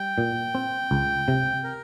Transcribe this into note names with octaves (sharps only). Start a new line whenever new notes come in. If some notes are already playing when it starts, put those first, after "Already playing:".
Already playing: G3 G5
A#2
C4
C#2
C3
A#4